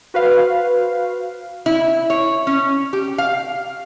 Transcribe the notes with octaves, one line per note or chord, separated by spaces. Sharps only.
F#4 B4 C5 F5
E4
C#5
C#4
G4
F5